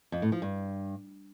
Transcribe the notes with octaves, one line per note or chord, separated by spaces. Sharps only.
F2
A2
F3
G2